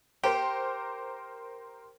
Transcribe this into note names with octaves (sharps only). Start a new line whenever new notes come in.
G4 A#4 C5